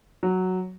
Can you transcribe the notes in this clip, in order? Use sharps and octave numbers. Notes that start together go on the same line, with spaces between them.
F#3